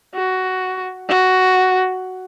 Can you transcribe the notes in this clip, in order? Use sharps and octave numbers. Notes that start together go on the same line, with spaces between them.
F#4
F#4